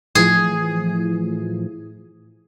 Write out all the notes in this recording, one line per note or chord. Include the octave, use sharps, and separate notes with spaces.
A2 E3 F3 G#4